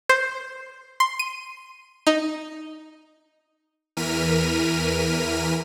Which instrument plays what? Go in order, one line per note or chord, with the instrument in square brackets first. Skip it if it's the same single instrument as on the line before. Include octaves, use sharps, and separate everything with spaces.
[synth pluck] C5
C6
D#7
D#4
[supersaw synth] E2 E3 A#4 F6 B6 D#7